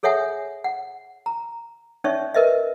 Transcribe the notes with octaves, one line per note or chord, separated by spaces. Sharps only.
G#4 A4 C#5 E5 F#5 G#5
F#5
A#5
C#4 D#4 C#5 D5 E5 C#6
A#4 B4 D#5 E5